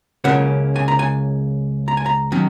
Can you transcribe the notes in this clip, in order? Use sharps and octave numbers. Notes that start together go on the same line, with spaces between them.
C#2 C#3 A#3 C#4 F#5
G#5
A#5
G#5
A#5
G#5
A#5
D#3 F#3 C#4